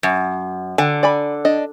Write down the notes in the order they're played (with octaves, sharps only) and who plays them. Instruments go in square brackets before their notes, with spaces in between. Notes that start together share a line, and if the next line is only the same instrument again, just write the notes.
[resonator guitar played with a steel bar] F#2
[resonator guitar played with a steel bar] D3 [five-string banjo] G#5
[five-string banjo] D5 G#5 B5
D4 D#5